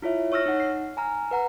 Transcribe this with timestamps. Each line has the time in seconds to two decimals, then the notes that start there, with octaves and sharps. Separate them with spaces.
0.02 E4 F4 C#5 E5
0.32 C#5 C#6 E6 F6 A#6
0.46 D#4 F#5
0.60 C7
0.97 G#5 A#5 F6
1.31 B4 F#5 A#5